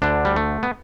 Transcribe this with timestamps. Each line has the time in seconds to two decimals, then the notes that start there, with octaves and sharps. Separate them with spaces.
0.02 D2 D3 D4
0.25 G3
0.36 A3
0.63 B3